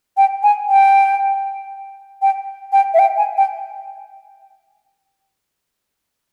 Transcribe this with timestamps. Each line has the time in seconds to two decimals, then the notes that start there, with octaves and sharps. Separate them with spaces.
0.17 G5
0.43 G#5
0.69 G5
2.22 G5
2.72 G5
2.94 E5
2.99 G5
3.17 G#5
3.37 G5